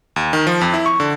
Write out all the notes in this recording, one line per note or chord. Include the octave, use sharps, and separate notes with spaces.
D#2
D#3
F3
F2
E4
C#6
D3